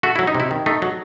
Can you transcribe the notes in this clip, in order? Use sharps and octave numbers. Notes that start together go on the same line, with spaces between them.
A3 F#4
F#3 E4
D#4
C3
E4
D#3
A3 D#4
F#3